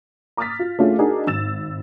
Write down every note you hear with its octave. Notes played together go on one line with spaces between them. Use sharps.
A#5 D6 D#6 F6 A6 B6
F4
A3 C#4 D4 F4 G#4
D4 D#4 F#4 G#4 A#4
G#1 E6 A6 E7